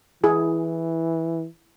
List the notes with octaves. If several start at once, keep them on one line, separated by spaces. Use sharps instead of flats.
E3 E4 G#4